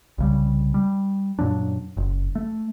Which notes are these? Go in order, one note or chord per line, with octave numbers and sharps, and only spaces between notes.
C2 C#3 G3
G3
F#2 A#2 F#3 D4
F#1
A3